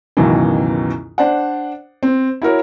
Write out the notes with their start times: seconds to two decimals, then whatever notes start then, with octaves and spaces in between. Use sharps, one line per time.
0.17 C#2 F#2 B2 D#3 E3
1.18 D4 C5 D5 F#5
2.03 C4
2.42 E4 F#4 A#4 C#5